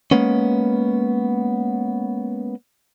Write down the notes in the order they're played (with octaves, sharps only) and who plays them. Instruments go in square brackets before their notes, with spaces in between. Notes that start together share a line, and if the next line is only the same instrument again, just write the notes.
[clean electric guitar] G#3 A#3 B3 C#4